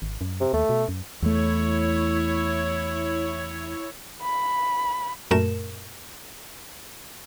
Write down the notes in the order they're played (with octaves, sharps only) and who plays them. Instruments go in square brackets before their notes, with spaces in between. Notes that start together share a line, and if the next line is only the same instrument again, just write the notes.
[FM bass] G#1
F#2
[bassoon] C3
[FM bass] D#2 [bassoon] A3
[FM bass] B2
F#2
[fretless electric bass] E2 A3 [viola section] E4 C#5
[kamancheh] B5
[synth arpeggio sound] F#2 A#2 A3 A#4 E7